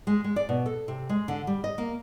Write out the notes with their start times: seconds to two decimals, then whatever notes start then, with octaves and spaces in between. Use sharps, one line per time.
0.07 G#3
0.24 G#3
0.36 D5
0.49 B2
0.66 A4
0.88 C3
1.09 G#3
1.28 D3
1.47 G3
1.64 D#5
1.78 A#3